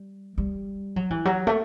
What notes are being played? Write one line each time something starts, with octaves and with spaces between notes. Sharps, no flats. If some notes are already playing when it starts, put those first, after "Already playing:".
Already playing: G3
G3
F#3
E3
F#3
A3